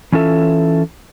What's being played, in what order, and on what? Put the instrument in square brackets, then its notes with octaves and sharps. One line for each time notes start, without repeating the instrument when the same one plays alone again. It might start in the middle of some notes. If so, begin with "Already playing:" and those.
[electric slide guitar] E3 C#4 F4 A4 E5